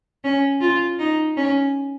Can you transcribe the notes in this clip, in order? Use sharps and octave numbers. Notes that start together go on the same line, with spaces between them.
C#4
F4
D#4
C#4